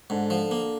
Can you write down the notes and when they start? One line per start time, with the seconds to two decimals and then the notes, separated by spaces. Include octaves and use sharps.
0.10 G#2 D3
0.30 F3
0.51 A#3